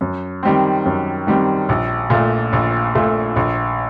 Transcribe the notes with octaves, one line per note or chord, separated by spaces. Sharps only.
F#2
D#3 G3 C4
F#2
D#3 G3 C4
A#1
A#2 A3
A#1
A#2 A3
A#1